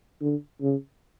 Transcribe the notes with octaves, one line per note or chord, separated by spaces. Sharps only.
D3
C#3